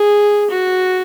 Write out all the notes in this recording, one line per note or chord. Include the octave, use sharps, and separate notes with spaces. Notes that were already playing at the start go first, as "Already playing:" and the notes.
Already playing: G#4
F#4